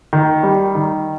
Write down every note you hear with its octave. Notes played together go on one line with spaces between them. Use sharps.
D#3
G3
D#3